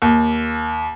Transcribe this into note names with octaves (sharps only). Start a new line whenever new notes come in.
D#2